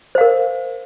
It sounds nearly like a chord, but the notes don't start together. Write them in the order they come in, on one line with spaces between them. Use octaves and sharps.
C5 F5 A#4